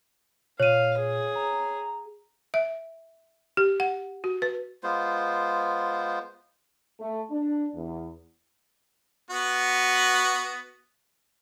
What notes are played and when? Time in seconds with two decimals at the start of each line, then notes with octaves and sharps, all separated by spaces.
0.60 A#2 C#5 F5 D#7
0.98 G#4
1.35 A#5
2.54 E5
3.57 G4
3.80 F#5
4.24 F#4
4.42 B4
4.83 G#3 B3 F4 C5
7.00 A3
7.31 D4
7.76 E2
9.31 B3 F#4